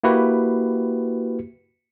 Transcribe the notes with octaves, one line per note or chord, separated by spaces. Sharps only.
A#3 E4 F#4 G4 B4